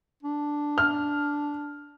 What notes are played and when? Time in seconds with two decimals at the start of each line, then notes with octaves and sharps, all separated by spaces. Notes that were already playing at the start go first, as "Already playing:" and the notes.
0.23 D4
0.78 F6